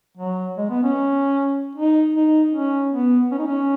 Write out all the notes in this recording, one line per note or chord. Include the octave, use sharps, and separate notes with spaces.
F#3
G#3
B3
C#4
D#4
D#4
C#4
B3
C#4
D#4
C#4